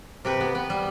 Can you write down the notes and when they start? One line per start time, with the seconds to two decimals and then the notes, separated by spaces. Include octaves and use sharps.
0.25 C3 G4 B4
0.41 B3
0.55 B3
0.70 G3